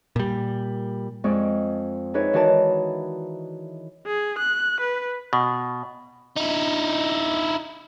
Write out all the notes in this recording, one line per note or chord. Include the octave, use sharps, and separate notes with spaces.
A#2 G3
F2 G#3 D5 C#6
D#4 G#4 B4 C#5 D5 E5
D#3 E3 F#4 A#4 D5 A5
G#4
F#6
B4
B2
D#4 E4